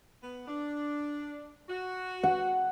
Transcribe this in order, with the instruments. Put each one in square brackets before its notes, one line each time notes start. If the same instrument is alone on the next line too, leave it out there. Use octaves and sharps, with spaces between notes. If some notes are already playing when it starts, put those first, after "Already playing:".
[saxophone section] B3
D4
F#4
[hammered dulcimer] F#5